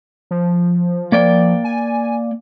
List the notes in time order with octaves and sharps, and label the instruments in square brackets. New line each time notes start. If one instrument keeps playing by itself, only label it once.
[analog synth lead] F3
[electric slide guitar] A#3 D5 G5
[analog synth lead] G#5